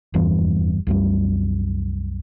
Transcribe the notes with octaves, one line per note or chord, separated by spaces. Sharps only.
F1 E2 G2 E3
C2 F#2 G3